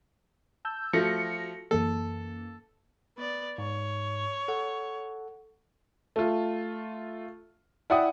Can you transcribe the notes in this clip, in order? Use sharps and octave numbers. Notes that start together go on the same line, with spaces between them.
A5 E6 G6
F3 A3 F#4 A#6 C#7
F#2 E3 A#3 A4
B3 D5
G#2 C#5
A4 F#5
A3 F4
E4 D5 F#5 G5 D#6